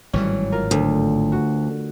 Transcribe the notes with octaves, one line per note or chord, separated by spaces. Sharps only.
G#1 A2 E3 F#3 G3 C#4
F4 A#4
D2
F#4